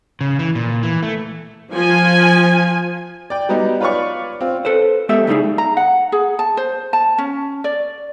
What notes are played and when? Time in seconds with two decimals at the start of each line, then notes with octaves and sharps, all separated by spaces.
0.21 C#3
0.39 E3
0.55 A#2
0.83 E3
1.03 A3
1.73 F3 G#5
3.30 D5 G5
3.49 F#3 G3 B3 D#4
3.81 F4 B4 C#5 D5 C#6
4.41 C4 F4
4.65 A4 B4 C5
5.09 G#3 B3 G4 A4 E5
5.27 C#2 A2 G3 D#4 G#4
5.58 A#5
5.77 F#5
6.12 G#4
6.39 A5
6.57 C5
6.93 A5
7.18 C#4
7.64 D5